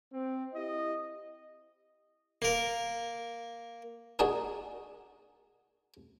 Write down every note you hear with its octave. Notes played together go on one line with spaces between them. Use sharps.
C4
E4 G4 D#5
A#3 A#4
D4 D#4 F#4 G#4 A#4